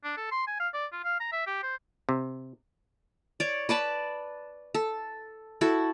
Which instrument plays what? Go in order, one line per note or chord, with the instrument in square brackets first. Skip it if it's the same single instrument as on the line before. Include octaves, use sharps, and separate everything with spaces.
[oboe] D4
A4
C6
G#5
F5
D5
F4
F5
A#5
E5
G4
C5
[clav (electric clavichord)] C3
[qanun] C#5 D5
B4 D5 A5 B5
A4
E4 F#4 A4